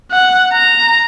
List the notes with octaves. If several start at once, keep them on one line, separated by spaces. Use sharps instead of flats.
F#5
A#5